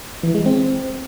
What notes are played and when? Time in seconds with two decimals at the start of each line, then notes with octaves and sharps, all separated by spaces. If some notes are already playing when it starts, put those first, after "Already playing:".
0.23 E3
0.35 G#3
0.46 C4